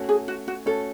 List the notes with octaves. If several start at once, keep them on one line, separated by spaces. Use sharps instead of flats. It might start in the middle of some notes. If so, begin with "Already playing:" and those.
Already playing: A3 C#4 F#4 C#5
G#4
F#4
F#4
A3 C#4 F#4 A4 C#5